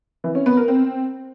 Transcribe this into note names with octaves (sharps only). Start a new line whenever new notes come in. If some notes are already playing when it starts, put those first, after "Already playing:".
E3
C#4
B3
A#4
C4